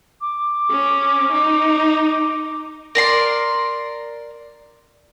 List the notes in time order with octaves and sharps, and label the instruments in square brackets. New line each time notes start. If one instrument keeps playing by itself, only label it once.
[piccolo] D6
[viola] C#4
D#4
[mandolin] A#4 D5 C6